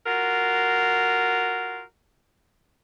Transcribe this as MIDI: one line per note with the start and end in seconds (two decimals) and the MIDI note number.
0.05 1.80 65
0.05 1.80 66
0.05 1.80 70